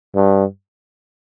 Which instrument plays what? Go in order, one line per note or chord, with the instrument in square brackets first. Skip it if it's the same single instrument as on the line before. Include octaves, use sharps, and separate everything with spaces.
[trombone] G2